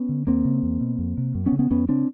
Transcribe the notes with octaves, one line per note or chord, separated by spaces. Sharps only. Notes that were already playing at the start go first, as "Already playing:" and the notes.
Already playing: B3 C#4
D3
D#2 A#3 C4
C#3
E2
B2
F2
C3
F#2
B3 C#4
C#3
B3 C#4
F2 B3 C#4
C#3 C4 D4